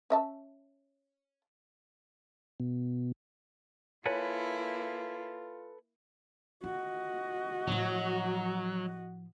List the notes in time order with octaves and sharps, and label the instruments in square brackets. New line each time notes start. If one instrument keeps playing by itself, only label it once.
[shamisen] C#4 E5 A5
[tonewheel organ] B2
[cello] A#3 E4 [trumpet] F4 [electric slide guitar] A4 B4 G#5 [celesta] C#5
[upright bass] F4 [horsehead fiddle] F#4 D#5
[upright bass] A2 F3 [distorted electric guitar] F#3